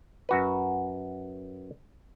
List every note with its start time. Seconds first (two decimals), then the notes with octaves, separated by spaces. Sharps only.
0.29 F#2 F#4 B4